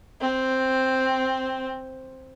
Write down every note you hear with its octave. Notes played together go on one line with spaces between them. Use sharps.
C4